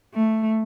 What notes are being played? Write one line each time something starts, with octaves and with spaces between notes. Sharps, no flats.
A3